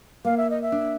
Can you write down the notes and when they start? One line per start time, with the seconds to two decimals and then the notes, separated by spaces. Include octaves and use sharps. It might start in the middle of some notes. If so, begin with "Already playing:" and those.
0.25 A#3 F5
0.37 E5
0.50 D#5
0.62 E5
0.72 D4